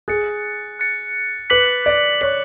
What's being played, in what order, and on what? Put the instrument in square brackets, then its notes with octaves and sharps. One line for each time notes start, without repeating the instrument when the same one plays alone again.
[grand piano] G#4 [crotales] F#6 A6 C#7
[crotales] F#6 A6 C#7
[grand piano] B4 [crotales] D6 F#6 B6 F#7
[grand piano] D5
[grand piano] C#5 [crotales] D6 F#6 B6 F#7